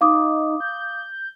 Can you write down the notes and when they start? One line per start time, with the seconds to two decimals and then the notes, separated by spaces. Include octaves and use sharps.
0.01 D#4 F5 D6 D#6
0.60 G6